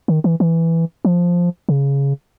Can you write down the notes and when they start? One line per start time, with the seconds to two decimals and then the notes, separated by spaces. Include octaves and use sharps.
0.08 D#3
0.24 E3
0.40 E3
1.05 F3
1.69 C#3